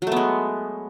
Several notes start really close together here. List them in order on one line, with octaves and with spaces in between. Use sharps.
F#3 A3 B3 G#3